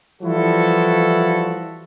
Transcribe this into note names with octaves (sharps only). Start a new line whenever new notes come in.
E3 F3 G3 E4 F#4 A4